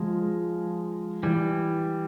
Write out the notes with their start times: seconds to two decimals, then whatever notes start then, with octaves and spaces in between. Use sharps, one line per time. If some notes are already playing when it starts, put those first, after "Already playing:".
Already playing: F3 G#3
1.23 E3 G3